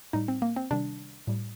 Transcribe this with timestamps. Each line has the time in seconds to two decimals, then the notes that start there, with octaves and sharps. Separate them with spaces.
0.13 A2 G3 D#4
0.28 C4
0.42 A#3
0.56 C4
0.71 C3 D#3 G3 D4
1.27 A2 G3